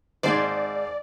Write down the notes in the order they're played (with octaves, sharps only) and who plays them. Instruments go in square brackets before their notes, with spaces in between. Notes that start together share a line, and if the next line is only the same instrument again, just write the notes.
[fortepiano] G#1 G#2 [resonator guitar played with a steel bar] D#4 G#4 C5 [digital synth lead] D5